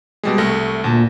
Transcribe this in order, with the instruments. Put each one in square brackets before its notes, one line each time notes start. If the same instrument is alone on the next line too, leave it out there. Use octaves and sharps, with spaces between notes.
[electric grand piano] B2 G3 G#3
C2 A3 A#6
[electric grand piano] D2 A5 [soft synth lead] A#2